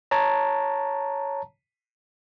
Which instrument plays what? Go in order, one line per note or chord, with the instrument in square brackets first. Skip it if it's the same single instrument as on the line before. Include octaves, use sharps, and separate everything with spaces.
[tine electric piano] C#5 A5 A#5